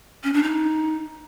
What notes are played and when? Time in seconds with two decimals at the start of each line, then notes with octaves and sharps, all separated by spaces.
0.24 C#4
0.33 D4
0.43 D#4